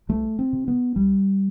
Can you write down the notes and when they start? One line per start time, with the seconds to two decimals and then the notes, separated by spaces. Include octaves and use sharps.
0.09 C2 A3
0.39 C4
0.53 C3
0.68 B3
0.96 C2 G3